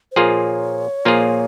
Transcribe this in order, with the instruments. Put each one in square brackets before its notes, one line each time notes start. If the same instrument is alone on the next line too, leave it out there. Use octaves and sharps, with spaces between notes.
[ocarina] C5
[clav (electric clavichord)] A#2 F3 A#3 F4 G#4 [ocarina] C#5
[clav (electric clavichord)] A#2 F3 A#3 F4 G#4